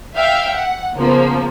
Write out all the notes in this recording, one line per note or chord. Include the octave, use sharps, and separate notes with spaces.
E5 F5 G5
F#5
C#3 F3 A#3 B3